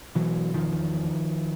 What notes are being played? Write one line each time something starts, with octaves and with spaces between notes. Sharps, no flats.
B2 E3 F#3
E2 D#3 F3